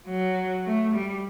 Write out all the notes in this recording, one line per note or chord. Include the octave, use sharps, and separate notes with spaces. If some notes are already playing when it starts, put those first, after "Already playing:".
F#3
A3
G3